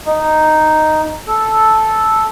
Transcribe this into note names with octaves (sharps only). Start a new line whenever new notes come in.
D#4
A4